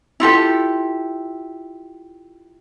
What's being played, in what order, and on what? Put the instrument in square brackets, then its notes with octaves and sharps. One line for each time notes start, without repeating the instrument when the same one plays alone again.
[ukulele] E4 F4 G4 A4